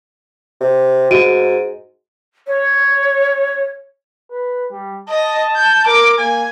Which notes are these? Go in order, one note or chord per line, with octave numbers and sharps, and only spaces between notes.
C3
G#2 F#4 D7 D#7
C#5
B4
G3
D#5 A5
G6
A#4 D6
A#3 G#5